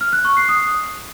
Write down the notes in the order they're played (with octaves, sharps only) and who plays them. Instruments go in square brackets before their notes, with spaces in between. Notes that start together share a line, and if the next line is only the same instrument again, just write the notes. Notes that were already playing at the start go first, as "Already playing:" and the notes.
[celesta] F6
F#6
C#6
C7
D#6